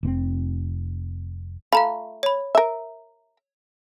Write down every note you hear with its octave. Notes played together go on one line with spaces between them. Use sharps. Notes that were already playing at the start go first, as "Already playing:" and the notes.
F1 B2 C4
A3 F4 F5 A#5 B5
C#5 B5
A#4 E5